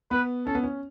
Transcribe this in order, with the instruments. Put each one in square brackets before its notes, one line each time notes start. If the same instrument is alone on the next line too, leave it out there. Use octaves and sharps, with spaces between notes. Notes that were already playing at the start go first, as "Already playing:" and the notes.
[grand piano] B3 [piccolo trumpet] B4
[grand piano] C#4 [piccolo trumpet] A4
[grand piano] B3
C#4